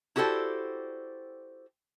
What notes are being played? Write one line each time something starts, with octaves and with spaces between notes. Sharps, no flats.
E4 F#4 G4 A4 C5 D5